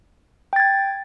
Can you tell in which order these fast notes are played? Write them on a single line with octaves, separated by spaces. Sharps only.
G5 A6 G#6